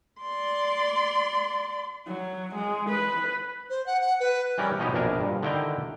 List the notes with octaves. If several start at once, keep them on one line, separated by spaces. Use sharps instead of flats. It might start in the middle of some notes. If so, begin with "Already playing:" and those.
D5 C6
F#3
G#3
B4
C5
F#5
F#5
B4
E3 G3 C#4 A#4
B2 F3 C#4 D#4 E4 G4
A#1 F2 B2 D4 A#4 G#5
G2 A#2
D3 D#3 E4 C5 G5 A#5